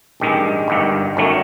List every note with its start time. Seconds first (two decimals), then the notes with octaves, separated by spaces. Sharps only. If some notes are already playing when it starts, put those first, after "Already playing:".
0.20 A1 G2 D#3 G#3
0.68 G1 G2 D#3
1.17 G1 F#2 D#3 F#3 A3